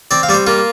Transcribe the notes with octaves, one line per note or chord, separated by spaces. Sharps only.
C4 D5
F5
G3 D5
C5
A#3 F4